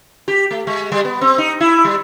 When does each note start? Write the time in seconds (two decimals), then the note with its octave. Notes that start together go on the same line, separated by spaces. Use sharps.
0.28 G4
0.51 A3
0.67 G#3
0.92 G3
1.05 B3
1.21 C4
1.38 D#4
1.60 E4
1.85 G3